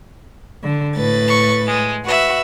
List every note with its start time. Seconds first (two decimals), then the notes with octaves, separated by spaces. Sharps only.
0.63 D3
0.96 A2 B4 A6
1.27 C#6
1.67 G#3
2.05 F#4 B4 E5